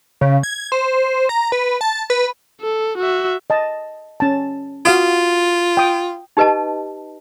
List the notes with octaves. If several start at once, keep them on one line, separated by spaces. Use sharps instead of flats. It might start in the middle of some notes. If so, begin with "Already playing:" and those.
C#3
G#6
C5
A#5
B4
A5
B4
A4
F#4 E5
D#5 A5
C#4 A5
F4 F#4 F5 D#6
G5 D#6
D#4 G4 B4 D#5 A5